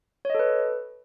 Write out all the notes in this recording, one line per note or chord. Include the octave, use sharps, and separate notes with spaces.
A4 B4 C#5 D#5